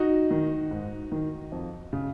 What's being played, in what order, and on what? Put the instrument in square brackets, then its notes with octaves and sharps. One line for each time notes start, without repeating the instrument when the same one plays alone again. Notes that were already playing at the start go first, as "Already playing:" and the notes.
Already playing: [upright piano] D#4 F#4
D#3
G#2
D#3
F2
C#3